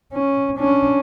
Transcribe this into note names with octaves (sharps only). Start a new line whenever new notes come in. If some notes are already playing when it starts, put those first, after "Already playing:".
C#4
C#4 D4